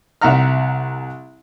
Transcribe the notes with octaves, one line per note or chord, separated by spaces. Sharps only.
C2 E5 F#5 A#5 F6